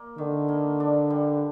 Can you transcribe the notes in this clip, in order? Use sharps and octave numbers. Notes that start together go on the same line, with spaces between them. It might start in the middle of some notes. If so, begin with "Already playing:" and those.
Already playing: A#3
D3 D#3
A#3
D4
G3